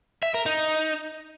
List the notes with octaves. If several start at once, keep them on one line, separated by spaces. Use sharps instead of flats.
E5
A#4
D#4